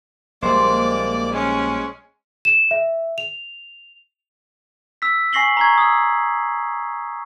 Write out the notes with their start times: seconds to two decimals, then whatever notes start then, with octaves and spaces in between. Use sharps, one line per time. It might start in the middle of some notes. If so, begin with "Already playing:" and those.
0.42 A#1 G3 G#3 A#3 C5 D5 D6
1.32 G#3 C#4
2.45 E7
2.71 E5
3.18 F7
5.02 E6 B6
5.33 G#5 C#6 A#6 C7 F#7 G7
5.57 A#5 C#6 G#6
5.78 D#6 E6